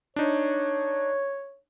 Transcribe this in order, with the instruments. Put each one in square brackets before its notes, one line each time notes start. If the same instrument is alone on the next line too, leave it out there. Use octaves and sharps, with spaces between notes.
[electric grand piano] D4 D#4 [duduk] C#5